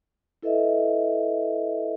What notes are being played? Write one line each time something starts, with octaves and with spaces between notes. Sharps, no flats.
E4 A4 B4 D#5 E5